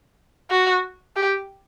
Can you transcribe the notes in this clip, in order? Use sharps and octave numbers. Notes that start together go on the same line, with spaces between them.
F#4
G4